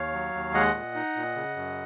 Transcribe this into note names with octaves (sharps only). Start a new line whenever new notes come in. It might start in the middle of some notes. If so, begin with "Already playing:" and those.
Already playing: D#2 C#5 F5
F#3
D#2
G#3 D#5 F#5
A#2
D#4
A#2
C#3
F#2